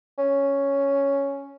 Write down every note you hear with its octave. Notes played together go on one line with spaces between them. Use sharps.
C#4